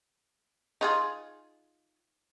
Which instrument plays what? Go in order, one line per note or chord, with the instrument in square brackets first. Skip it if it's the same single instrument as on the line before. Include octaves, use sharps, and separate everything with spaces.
[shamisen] D#4 F4 G#4